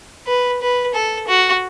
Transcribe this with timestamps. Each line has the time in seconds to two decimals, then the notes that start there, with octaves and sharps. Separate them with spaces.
0.27 B4
0.62 B4
0.94 A4
1.28 F#4